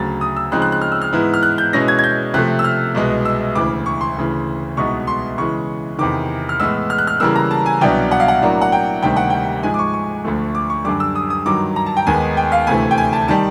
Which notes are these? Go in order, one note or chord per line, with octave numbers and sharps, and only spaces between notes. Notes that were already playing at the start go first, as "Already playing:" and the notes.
Already playing: D2 C#3 F#3 A6
D#6
E6
C#3 F3 G#3 C4 D#4 F#6
F#6
F#6
F6
E6
F6
G#2 E3 G#3 B3 E4
F6
F#6
G6
B2 G#3 C#4 E4 A#6
G#6
G#6
G6
C3 F3 A3 F#6
E6
F6
C2 B2 G#3
E6
D2 C#3 E3 D6
C#6
C6
D2 C#3 E3
C2 B2 G#3 B3 D#4 C#6
C6
C#3 E3 G#3 C#6
E2 C3 D#3 D6
F6
A2 E3 G#3 B3 E6
F6
F#6
F6
C#3 E3 G3 A#3 E6
A#5
A5
G#5
C2 B2 F#3 B3 D4 G5
F#5
F5
F#5
A2 F#3 A#3 D4
F#5
G5
D2 C3 D#3 G3 A#3 G5
F#5
G5
G#2 F3 G#3 G#5
D6
C#6
C#6
D2 D3 F3 A3
D6
C#6
F#2 D3 G3 D6
E6
D#6
D#6
G2 D#3 F#3 D6
A#5
A5
G5
D#2 D#3 G#3 B3 G#5
G5
F5
D2 C3 E3 A3 G#5
G5
G#5
A5
D#3 G3 A5